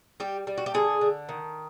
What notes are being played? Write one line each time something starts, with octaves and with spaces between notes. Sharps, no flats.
G3 G4
G3
F#4
G4
D3 G#4
D3
D#3